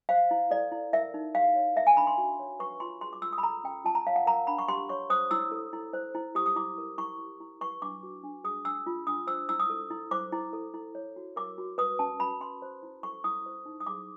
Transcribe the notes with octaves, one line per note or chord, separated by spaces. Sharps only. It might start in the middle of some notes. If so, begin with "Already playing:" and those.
C5 F5
E4
A4 D5
E4
A#4 E5
D#4
G4 F5
C#5
A#4 E5
G#5
D4 B5
C6
F#4
C#5
B4 C#6
F4 C6
G#4 C6
D6
F4 E6
D#6
B5
A4 A#5
C#4 G5
F4 A5
A#5
C#5 F5
F#5
A#4 A#5
D4 B5
C#6
G4 C6
C#5 C#6
C5 D#6
E4 E6
A4
E4
C5
E4
G4 D#6
D#6
E4 D6
A#4
E4 C#6
G4
E4
B4 C#6
D4 D6
F#4
D4
G#4 D#6
D4 E6
F4
D4 D#6
C5 E6
E4 E6
D#6
A4
E4
C5 D6
E4
A4
E4
C#5
F#4
A#4 D6
F#4
B4 D#6
C#4 A5
F#4 B5
C#4 C6
C5
E4
A4 C#6
E4 D#6
C5
D#4
D#6
G#4 D6